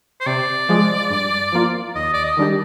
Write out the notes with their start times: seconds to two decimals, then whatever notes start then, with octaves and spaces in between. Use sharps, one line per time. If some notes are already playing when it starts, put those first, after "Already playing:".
0.20 C5
0.26 C3 D5
0.69 F3 G#3
1.10 G2
1.52 F3 A#3 F4
1.95 D#2 D#5
2.13 D5
2.23 D#5
2.37 D#3 G3 D4 G4